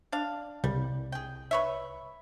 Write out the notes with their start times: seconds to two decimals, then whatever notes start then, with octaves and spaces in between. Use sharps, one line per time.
0.12 D4 F5
0.64 C2 G3
1.12 G#4 G5
1.51 B4 C#5 E5